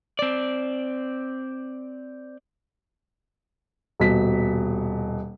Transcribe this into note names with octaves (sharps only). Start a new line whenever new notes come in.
C4 D5
D#1 B2 B6